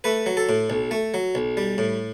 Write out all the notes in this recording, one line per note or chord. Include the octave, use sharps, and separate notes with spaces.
A3 B4
F#3
A4
A2
B1
A3
F#3
B1
G3
A2